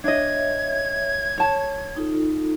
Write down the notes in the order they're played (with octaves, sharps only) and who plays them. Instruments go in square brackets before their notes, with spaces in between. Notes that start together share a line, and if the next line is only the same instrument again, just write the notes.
[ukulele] D4 D#5 [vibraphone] C#5 E5 [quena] G#6
[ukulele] C#5 A5
[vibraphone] D#4 F4 A4